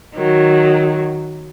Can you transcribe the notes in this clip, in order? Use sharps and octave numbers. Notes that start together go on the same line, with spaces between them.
D#3 F#3